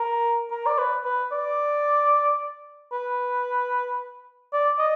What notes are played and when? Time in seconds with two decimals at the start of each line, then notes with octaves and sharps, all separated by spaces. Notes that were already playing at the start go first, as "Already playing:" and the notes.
Already playing: A#4
0.51 A#4
0.66 D5
0.78 B4
1.05 B4
1.32 D5
2.92 B4
4.53 D5
4.79 D#5